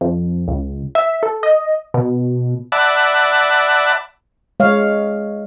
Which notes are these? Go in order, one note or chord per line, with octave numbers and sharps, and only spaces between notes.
F2
C#2
E5
A4
D#5
B2
D5 E5 F#5 A5 B5
G#3 C#5 F5